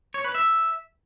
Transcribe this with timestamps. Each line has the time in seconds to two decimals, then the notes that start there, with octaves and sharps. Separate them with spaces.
0.14 C#5
0.24 B4
0.35 E5